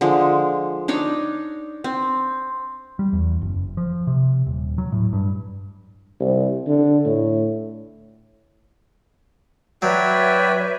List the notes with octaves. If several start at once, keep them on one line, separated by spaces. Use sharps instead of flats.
D3 F3 G#3
D4 D#4 C#5 D5
C4
G3
E2
F#1
F3
C3
D#1
F#3
A2
G2
C2
D3
A2
F#3 F#4 B4 C#5 D5 E5 G5